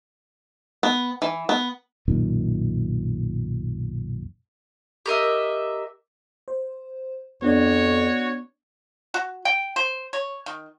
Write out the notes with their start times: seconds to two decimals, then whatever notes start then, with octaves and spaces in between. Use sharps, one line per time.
0.83 B3
1.22 E3
1.49 B3
2.08 B1 F#2 A#2 D#3
5.06 G4 A#4 D#5 E5
6.48 C5
7.42 F2 B3 D4 F#4 C#5 D5
9.14 F#4
9.45 G5
9.76 C5
10.13 C#5
10.46 D#3